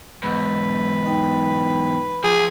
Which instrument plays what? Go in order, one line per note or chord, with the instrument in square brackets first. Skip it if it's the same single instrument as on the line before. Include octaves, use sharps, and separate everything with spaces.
[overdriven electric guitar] E2 G#2 [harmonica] B4 [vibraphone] E6
[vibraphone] D#4 G5
[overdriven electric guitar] F3 [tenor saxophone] G#4